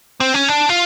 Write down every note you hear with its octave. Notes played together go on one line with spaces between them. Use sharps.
C4
C#4
D4
F4